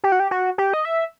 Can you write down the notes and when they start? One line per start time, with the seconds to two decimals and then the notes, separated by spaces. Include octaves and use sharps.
0.04 G4
0.12 F#4
0.20 G4
0.31 F#4
0.58 G4
0.74 D#5
0.85 E5